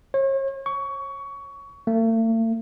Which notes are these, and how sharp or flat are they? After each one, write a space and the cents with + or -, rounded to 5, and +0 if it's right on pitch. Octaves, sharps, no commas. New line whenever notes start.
C#5 -40
C#6 +20
A3 +45